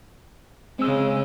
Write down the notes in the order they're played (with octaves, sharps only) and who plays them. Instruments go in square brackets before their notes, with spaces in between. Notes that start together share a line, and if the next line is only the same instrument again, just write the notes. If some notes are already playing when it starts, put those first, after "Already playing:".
[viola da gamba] C#3 G#3 [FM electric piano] C4 E6